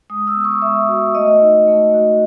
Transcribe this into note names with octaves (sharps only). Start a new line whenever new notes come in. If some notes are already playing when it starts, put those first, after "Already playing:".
G#3 D#6
E6
B3
C#6
G#3 E5
F#4
A3 D#5
D#4
A3
F#4